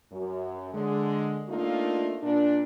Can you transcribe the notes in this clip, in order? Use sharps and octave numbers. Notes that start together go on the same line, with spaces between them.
F#2
D3 G#3
A3 A#3 D4 D#4 F4
A#2 D4